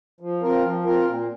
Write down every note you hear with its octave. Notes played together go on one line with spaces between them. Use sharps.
F3
C4 F4 A#4
F3
C4 F4 A#4
A#2